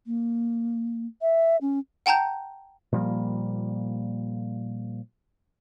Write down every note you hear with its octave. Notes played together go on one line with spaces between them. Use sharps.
A#3
E5
C#4
F#5 G5 A5 A#5 G6
A#2 F3 G3 A#3